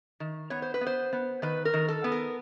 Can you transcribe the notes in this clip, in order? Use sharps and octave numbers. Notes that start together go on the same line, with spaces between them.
D#3
B3 C#5
C5
B4
B3
C5
B3
D#3 B4
A#4
D#3
A4
B3
A#4